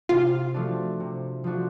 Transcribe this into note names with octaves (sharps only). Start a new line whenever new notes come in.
C3 F4
F3 A3 D4 F#4
C3
F3 A3 D4 F#4